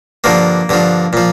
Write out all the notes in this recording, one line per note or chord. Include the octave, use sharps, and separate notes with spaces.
G2 D3 F3 A#3
G2 D3 F3
A#2 F3